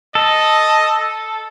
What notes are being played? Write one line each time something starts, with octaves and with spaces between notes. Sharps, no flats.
A4 D#5